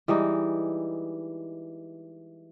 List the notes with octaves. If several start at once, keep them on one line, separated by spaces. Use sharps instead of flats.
E3 G3 G#3 D#4